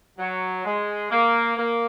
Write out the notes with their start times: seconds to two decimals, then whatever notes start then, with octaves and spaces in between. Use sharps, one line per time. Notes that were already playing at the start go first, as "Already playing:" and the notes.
0.19 F#3
0.65 G#3
1.10 A#3
1.57 A#3